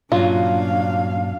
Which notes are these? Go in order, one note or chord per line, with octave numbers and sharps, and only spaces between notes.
G2 A#2 F#3 C#4 D4 F4 F5